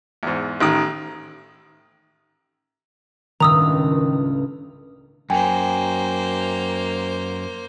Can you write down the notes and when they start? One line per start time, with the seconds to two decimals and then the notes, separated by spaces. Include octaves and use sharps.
0.23 E2 G#2
0.60 A1 D#3 D#6
3.40 G1 C#2 A2 D#3 A#5 D#6 E6
5.30 F#2 A#3 C5 G5 G#5